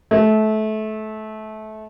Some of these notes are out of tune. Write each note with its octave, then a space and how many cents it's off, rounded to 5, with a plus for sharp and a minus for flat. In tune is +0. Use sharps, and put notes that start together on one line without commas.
A3 -25